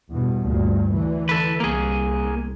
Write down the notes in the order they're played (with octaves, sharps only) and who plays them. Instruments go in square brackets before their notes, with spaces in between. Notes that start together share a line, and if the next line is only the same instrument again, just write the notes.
[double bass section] E2 G2 B2
D2 G2 A#2
D3 E3
[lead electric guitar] A4 B4
[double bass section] C2 [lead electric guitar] A#3 G#4